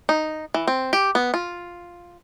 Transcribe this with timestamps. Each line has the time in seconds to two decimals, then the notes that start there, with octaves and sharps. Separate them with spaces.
0.09 D#4
0.54 E3
0.68 C4
0.93 G4
1.15 B3
1.34 F4